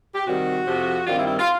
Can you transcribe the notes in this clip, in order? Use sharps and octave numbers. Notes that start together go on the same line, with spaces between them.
G4
C3 D#3 G3 C4 F#4
F2 C3 F3
G2 D#3 G3 C4 F4
E4
E4
F4